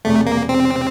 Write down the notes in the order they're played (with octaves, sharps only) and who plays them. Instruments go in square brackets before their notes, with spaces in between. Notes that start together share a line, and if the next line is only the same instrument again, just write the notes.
[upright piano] E1 E2 C3 [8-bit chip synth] A3
[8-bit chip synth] A#3
C4
[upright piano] C3